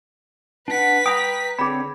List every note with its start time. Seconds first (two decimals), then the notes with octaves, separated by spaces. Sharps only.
0.68 D4 B4 F#5 B6
1.06 G5 A#5 B5 D#6
1.59 D3 C4 G#4 C#5 B5